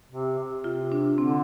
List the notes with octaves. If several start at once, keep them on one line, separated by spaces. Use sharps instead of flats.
C3
C3
F4
D4
D3 C4